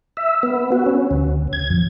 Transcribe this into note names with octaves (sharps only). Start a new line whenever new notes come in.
E5
B3
F#4
C#4
D2
G#6
F2